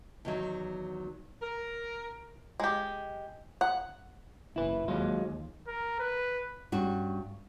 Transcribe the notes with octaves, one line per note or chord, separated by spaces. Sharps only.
E2 D#3 F#3
A#4
G#3 G4
F#5
F#1 E4 B4
D#2 F#3 G#3 F4
A#4
B4
G2 C#4 F#4